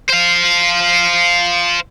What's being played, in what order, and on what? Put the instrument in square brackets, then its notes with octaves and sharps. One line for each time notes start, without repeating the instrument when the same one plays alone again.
[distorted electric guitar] C5 F5